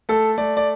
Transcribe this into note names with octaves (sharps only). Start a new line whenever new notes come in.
A3 A4
A3 D5
D5